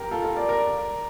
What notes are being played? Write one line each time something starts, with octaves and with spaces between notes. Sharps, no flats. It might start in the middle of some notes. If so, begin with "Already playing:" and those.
Already playing: G4 A#4
F4 A4
F4 A4
A#4 D5
A#4 D5